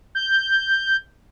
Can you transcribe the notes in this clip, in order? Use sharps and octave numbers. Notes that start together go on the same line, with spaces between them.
G6